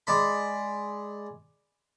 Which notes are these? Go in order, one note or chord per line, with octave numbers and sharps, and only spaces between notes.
G#3 D5 B5